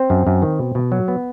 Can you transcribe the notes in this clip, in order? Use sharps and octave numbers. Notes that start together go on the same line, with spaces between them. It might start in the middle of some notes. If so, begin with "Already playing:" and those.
Already playing: C4 C5
F#2
F#2
D#3
B2
B2
F#3
B3